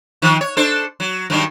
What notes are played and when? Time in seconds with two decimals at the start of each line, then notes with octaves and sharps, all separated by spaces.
0.22 D#3 F3
0.41 C#5
0.57 D4 A4 C5
1.00 F#3
1.30 G2 D#3 F#3